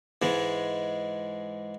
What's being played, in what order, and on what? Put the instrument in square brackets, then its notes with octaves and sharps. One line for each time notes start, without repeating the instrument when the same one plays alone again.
[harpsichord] G#2 E3 G#3